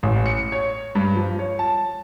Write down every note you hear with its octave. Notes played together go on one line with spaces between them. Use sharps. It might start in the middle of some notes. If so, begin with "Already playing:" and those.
A1
C#7
C#5
G2
F3
C#5
A5